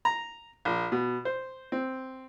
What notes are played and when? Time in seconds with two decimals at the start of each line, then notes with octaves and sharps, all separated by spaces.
0.05 A#5
0.65 A#1
0.92 B2
1.25 C5
1.72 C4